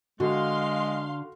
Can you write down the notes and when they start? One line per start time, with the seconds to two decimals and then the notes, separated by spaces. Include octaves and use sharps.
0.20 D3 G#3 F#4 F5 C6